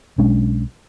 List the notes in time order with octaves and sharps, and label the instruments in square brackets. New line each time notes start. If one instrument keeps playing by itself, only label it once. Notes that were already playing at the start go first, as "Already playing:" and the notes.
[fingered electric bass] B1 G#3 C#4 D4